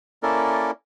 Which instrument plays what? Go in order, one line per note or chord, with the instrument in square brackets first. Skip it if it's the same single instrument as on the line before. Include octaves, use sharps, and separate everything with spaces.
[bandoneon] A#3 C#4 E4 A4 A#4 D5